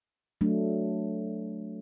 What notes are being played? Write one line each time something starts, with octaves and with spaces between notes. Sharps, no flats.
F#3 A3 D4